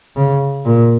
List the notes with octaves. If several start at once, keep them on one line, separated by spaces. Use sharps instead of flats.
C#3
A#2